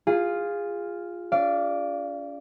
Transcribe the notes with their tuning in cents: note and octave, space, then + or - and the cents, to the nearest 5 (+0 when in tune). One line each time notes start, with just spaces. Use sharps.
F4 +0 G#4 -25
C#4 +45 D5 +0 F5 -25